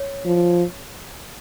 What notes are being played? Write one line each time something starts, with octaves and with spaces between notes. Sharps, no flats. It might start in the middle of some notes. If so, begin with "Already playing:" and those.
Already playing: C#5
F3